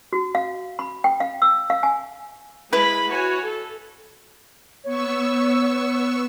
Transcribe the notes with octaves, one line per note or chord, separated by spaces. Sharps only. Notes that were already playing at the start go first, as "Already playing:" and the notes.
F#4
F5
B5
G5
F5
E6
F5
G#5
G#3 E4 B4 B5
F#4 C#5 G#5
A4
B3 C#5 C#6 E6